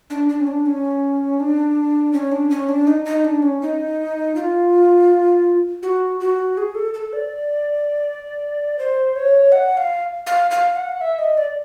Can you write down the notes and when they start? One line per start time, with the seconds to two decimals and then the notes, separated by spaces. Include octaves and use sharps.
0.10 D4
0.29 D4
0.40 C#4
0.47 D4
0.66 C#4
1.40 D4
2.13 C#4
2.32 D4
2.50 C#4
2.68 D4
2.87 D#4
3.05 D#4
3.25 D4
3.42 C#4
3.62 D#4
4.36 F4
5.83 F#4
6.20 F#4
6.57 G#4
6.75 A4
6.94 A4
7.13 D5
8.79 C5
9.15 C#5
9.52 F#5
9.77 F5
10.27 F5
10.51 F5
10.76 F#5
11.01 E5
11.19 D#5
11.37 D5